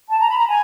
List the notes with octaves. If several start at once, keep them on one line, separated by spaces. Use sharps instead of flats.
A5
A#5
B5
A#5
G#5